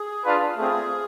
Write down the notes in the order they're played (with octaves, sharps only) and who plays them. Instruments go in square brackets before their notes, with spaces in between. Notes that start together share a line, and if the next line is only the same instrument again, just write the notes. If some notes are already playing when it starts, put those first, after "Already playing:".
Already playing: [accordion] G#4
[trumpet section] D4 F4 B4 F5
[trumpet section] A3 C4 F4 [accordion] G#4